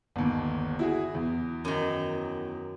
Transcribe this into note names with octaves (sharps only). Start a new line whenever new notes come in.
G1 D#2
E4 F#4 G#4
E2
F#2 D#3